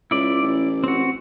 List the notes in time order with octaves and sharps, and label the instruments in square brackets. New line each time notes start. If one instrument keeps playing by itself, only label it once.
[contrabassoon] C#2 [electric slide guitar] E4 D5
[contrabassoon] A1
[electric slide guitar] C4 F#4